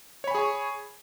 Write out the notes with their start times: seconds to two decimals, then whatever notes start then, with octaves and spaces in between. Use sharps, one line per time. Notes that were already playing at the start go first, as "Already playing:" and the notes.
0.24 C#5
0.28 B5
0.31 G#5
0.35 G#4
0.38 C#6